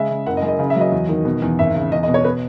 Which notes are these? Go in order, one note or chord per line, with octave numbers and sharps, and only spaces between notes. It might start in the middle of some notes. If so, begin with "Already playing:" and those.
Already playing: C#3 G#3 E5
C#3
F#1 F#5
D#5
F#2
D#5
C#3
E5
F#3 D#5
E2
D#3
B2
E2
G#1 E5
C#3
E2 D#5
D#5
B2
C#5
B4